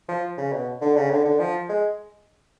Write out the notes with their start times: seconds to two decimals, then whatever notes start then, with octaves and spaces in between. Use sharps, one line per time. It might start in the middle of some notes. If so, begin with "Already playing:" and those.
0.08 F3
0.38 C#3
0.52 B2
0.81 D3
0.96 C#3
1.11 D3
1.25 D3
1.40 F3
1.69 G#3